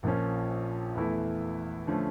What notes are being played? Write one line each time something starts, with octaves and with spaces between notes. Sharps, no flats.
A#1 A#2 F3 C#4
E2 E3 A3 E4
D3 F3 A3 C#4